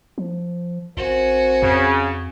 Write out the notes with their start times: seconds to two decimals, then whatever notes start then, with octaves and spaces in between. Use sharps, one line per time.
0.18 F3
0.97 A1 C4 F#4 A#4 C5 G#5
1.62 F2 C#3